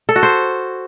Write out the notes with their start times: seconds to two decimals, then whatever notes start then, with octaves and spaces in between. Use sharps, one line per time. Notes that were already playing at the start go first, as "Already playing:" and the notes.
0.09 A4
0.16 F#4
0.23 C5